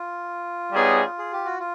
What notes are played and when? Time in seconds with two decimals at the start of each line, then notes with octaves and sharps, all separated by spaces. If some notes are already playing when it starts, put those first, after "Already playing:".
Already playing: F4
0.72 G3 B3 D#4 G#4 C#5
1.19 G#4
1.33 G4
1.45 F#4
1.59 F4